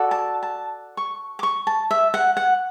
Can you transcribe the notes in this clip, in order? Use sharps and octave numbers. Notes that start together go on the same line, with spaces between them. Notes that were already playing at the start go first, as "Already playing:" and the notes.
Already playing: F#4 A4 D5
A5
A5
C#6
D6
C#6
A5
E5
F#5
F#5